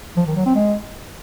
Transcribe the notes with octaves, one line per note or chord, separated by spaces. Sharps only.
F3
D#3
F#3
C4
G#3